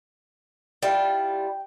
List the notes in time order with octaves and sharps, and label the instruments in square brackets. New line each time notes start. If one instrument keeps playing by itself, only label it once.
[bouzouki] G3 E4 F4 [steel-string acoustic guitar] G5